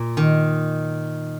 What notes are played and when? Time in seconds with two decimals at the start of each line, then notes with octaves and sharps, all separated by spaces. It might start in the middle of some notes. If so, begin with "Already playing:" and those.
Already playing: A#2
0.17 D#3